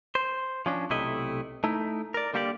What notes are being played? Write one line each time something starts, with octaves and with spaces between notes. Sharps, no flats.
C5
F3 C#4 D4
B1 C3 A3 E4 D#5
A3 D#4 E4
A#4 D5
D3 G3 A#3 G4 C#5 D5